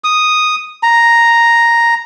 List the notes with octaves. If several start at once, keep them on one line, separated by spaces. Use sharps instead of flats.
D#6
A#5